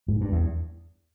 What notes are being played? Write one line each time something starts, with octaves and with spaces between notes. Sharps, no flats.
G#2
G2
E2